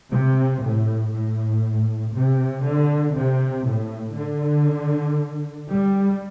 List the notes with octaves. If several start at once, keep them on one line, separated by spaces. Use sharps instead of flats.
C3
A2
A2
C3
D3
C3
A2
D3
G3